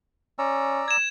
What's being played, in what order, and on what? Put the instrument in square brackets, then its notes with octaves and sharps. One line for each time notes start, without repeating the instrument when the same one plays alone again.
[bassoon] C#4 [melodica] D5 A#5 E6
[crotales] G#6 E7